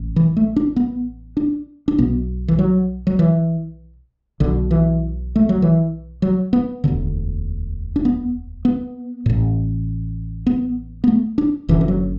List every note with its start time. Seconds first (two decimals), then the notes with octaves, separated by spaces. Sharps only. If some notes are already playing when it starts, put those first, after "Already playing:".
Already playing: A1 A2
0.16 E3
0.37 A3
0.56 D4
0.76 B3
1.37 D4
1.88 D4
1.98 B1 B2 B3
2.48 E3
2.59 F#3
3.07 F#3
3.19 E3
4.40 B1 B2 D3
4.71 E3
5.36 A3
5.49 F#3
5.62 E3
6.22 F#3
6.53 B3
6.84 E1 D2 D3
7.96 D4
8.05 B3
8.65 B3
9.26 A1 A2
10.47 B3
11.04 B3
11.08 A3
11.38 D4
11.69 F#1 F#2 D3 E3
11.81 E3
11.88 F#3